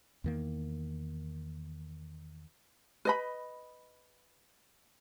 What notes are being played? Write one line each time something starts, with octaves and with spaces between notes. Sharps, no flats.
E2 D#3 A#3
B4 D#5 B5